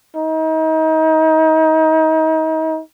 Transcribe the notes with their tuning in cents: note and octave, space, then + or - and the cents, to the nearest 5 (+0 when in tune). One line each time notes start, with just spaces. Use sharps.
D#4 +35